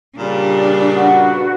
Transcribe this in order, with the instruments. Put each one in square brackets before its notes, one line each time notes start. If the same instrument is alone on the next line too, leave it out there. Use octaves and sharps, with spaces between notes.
[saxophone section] A#2 C#3 G3 [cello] D4
[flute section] F#4 B4